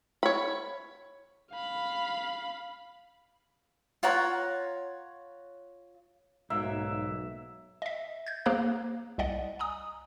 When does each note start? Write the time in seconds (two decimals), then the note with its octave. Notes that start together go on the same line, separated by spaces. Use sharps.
0.23 C#5 B5
1.52 F5 B5
4.03 F4 C#5 F#5 A#5
6.50 B1 G#2 F#3 A#3 E5
7.82 D#5 E5
8.27 G6 G#6
8.46 A#3 G#4 C5 F5 A#5 F#6
9.18 C2 D5 D#5 F#5
9.59 G#5 A#5 D#6